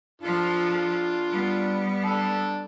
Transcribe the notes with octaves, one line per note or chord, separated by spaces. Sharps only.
F3 D4 F4 A4
G3 B3
D4 A4 A5